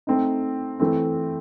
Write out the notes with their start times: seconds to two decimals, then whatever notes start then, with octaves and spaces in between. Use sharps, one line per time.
0.07 A3 C4 D#4
0.80 E3 A3 C4